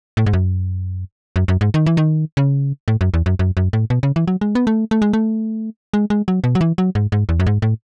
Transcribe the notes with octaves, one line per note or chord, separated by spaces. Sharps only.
A2
G#2
F#2
F#2
F#2
G#2
D#3
E3
D#3
C#3
A2
F#2
E2
F#2
F#2
F#2
A2
B2
C#3
E3
F#3
G#3
B3
A3
A3
G#3
A3
G#3
G#3
F#3
B2
F#3
E3
F#3
G#2
G#2
E2
F#2
G#2
A2